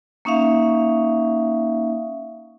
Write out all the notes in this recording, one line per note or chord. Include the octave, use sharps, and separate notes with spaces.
A#3 C#4 D#4 E5 F5